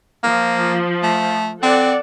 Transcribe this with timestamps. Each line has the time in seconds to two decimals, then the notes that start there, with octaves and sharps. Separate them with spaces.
0.23 F3 A#3
1.03 A3
1.63 C4 A4 D5 F#5